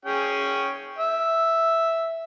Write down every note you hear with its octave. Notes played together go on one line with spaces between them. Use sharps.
C#4 G#4 G5
E5